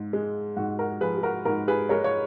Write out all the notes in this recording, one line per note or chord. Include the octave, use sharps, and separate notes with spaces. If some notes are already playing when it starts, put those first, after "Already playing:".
Already playing: G#2
G#3
G#2 F#4
F#4 A#4
F3 G#4 B4
G#4
F#4 A#4
G#2 F#4 A#4
G#4 B4
G#3 A#4 C#5
C#5